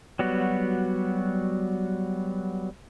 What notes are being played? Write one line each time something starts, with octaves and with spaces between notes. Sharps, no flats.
F#3 G3 B3 F#4